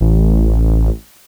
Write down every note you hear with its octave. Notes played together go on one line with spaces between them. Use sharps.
A1